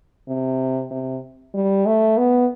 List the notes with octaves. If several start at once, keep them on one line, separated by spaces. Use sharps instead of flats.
C3
C3
G3
A3
B3